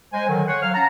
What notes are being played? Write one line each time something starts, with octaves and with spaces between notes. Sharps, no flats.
G#3 C5 G#5
D3 D#3 F#3
C5 C#5 F#5
F#3 F5 F6
C#4 F#5 A5 A#5